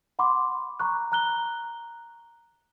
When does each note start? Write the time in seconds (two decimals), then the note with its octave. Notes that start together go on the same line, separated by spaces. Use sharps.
0.19 F#5 B5 C6 D6
0.80 A#5 B5 C#6 F#6
1.12 A#5 F#6 G7